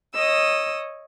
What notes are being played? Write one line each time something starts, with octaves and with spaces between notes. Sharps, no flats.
C#5 D#5 D#6 E6